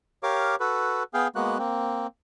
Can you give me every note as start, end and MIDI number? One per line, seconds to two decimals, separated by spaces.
0.23 0.56 67
0.23 0.56 70
0.23 0.56 73
0.23 0.56 77
0.23 0.56 86
0.60 1.03 66
0.60 1.03 69
0.60 1.03 71
1.14 1.28 59
1.14 1.28 68
1.14 1.28 77
1.14 1.28 79
1.35 1.58 56
1.35 1.58 58
1.35 1.58 59
1.35 1.58 66
1.35 1.58 90
1.58 2.07 58
1.58 2.07 60